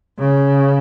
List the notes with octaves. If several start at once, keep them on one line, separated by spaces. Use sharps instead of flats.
C#3